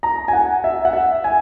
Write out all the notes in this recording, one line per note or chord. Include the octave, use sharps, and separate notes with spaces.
A#5
G#5
F#5
E5
F#5
E5
G#5